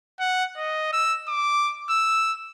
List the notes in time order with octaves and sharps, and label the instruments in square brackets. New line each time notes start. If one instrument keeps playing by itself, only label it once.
[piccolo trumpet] F#5
D#5
E6
D6
E6